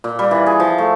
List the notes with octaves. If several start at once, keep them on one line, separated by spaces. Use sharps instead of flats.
A#2
G3
E3
G#4
F3
A3